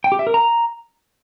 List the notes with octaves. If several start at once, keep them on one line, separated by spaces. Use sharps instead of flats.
G5
G4
E5
A#4
A#5